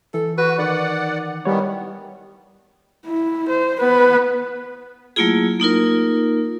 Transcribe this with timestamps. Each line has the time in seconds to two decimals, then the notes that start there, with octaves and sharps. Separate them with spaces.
0.14 E3 A4
0.38 F#4 B4
0.58 D#3 D5 F#5
1.45 D#3 E3 G3 B3 C#5
3.06 E4
3.49 C5
3.79 B3 B4
5.16 F#3 A3 A#3 E4 F4 G#4
5.60 A#3 D#4 F4 A#4